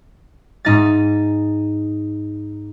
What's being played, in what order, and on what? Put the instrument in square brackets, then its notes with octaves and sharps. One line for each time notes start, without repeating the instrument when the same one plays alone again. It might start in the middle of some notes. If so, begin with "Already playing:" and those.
[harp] G#2 D#4 A6